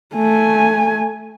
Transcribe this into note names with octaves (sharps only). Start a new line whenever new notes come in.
A3 G#5